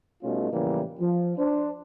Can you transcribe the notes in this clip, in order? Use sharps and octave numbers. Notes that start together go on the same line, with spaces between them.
B2 G3 A3 C#4 D#4 F4
A2 C#3 E3 F3 G3 A#3
F3
D4 C5